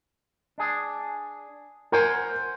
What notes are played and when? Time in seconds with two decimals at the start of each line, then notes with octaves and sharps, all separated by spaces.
0.58 D4 G#4
1.92 A#4 C5 F#5 G#5